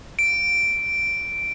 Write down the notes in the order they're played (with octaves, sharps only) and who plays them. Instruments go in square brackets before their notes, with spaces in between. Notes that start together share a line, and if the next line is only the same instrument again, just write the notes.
[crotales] D7